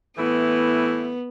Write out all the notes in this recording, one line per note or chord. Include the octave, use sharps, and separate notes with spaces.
A2 E3 B3 E4